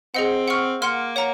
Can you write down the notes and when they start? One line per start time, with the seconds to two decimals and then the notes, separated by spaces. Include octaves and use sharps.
0.15 C4 G#4 D#5 F#5
0.48 F#5 C#6 F6
0.81 A#3 F#5 C6 F6
1.16 C#5 F#5 A#5